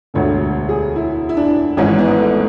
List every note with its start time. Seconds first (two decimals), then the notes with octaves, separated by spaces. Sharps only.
0.14 E1 D2 D3 C#5
0.69 G#4
0.96 E4
1.29 E4
1.37 D4
1.77 G#1 G#2 E3 C#4
1.99 B3
2.18 A3